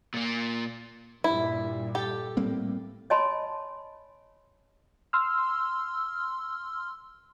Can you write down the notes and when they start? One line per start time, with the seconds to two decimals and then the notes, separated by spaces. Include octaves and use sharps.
0.14 A#2 A#3
1.24 G2 A#2 G3 E4
1.95 G4 A4
2.37 A2 G3 A#3 C4
3.10 C#5 D#5 G#5 A5 B5 C6
5.13 C6 E6 F6